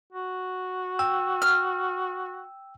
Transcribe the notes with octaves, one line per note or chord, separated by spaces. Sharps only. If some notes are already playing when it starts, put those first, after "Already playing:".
F#4
G5 E6
F6